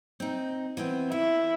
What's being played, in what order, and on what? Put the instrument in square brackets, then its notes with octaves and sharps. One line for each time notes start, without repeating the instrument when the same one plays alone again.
[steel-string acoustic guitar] C4 D#4
E3 B3 C4
[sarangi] E4 [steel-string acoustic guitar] E5